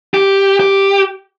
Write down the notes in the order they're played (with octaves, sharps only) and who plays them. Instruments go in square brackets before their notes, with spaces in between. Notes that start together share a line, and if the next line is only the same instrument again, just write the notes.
[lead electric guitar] G4
G4